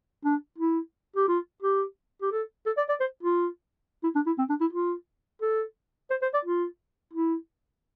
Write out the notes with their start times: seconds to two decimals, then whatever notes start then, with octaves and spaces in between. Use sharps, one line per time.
0.25 D4
0.58 E4
1.16 G4
1.28 F4
1.62 G4
2.22 G4
2.32 A4
2.66 A4
2.77 D5
2.89 D5
3.00 C5
3.23 F4
4.03 E4
4.15 D4
4.27 E4
4.38 C4
4.49 D4
4.61 E4
4.73 F4
5.42 A4
6.10 C5
6.22 C5
6.34 D5
6.45 F4
7.14 E4